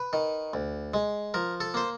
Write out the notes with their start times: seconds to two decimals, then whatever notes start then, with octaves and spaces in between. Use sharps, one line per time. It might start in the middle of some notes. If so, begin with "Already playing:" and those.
Already playing: B4
0.13 D#3
0.54 D2
0.94 G#3
1.34 F3 A#4
1.60 A4
1.74 A#3 C5